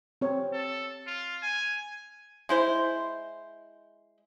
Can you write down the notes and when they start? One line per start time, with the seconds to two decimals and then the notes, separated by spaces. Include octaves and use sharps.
0.21 C4 C#5
0.53 A4
1.07 F4
1.42 G#5
2.49 G#3 E4 C5